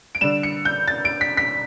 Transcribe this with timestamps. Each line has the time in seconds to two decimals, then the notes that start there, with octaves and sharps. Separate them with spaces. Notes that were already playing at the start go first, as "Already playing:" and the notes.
0.15 D7
0.21 D3 G3 E7
0.43 C#7
0.65 G6
0.88 A6
1.05 D7
1.21 B6
1.37 B6